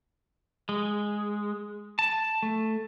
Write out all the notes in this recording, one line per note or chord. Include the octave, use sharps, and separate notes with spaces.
G#3
A5
A3